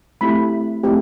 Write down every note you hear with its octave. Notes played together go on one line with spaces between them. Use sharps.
A3 C4 E4 G4 B5
A3 C4 E4 G4